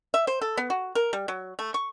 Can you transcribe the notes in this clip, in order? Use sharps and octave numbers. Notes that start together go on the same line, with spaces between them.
E5
C5
A4
B3
F#4
A#4
G3
F#3
A3
C#6